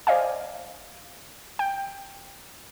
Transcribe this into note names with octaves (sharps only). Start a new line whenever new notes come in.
C5 D5 D#5 F5 G#5
G5